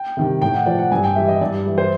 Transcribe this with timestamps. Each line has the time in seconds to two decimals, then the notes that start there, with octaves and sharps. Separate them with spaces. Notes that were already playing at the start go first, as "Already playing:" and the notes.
Already playing: G5
0.17 C3 D#3 G3
0.42 A2 G5
0.54 F#5
0.66 F3 D5
0.78 F#5
0.92 G2 G#5
1.04 G5
1.16 E3 G3 E5
1.28 D#5
1.41 G2 D5
1.66 E3 G3
1.78 C5